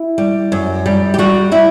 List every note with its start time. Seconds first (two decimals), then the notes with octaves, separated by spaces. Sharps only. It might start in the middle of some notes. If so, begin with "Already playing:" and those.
Already playing: E4
0.18 G3
0.52 F#2
0.86 G3
1.14 G4
1.18 G3 F#4
1.52 G3 E4